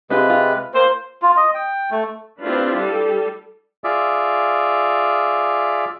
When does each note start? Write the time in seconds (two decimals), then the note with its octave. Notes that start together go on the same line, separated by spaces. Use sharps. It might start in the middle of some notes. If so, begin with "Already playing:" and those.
0.10 C3 G#3 C4 F4 G4 B4
0.30 F4
0.74 A#3 C5
1.22 F4
1.37 D#5
1.54 G5
1.91 A3
2.43 C4 D4 E4 F4 G4 B4
2.76 G3 A4
3.84 F4 G#4 D5 E5